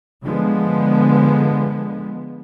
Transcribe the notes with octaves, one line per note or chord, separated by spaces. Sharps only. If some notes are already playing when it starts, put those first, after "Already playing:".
D3 F3 G#3 B3